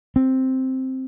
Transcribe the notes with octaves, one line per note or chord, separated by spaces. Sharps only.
C4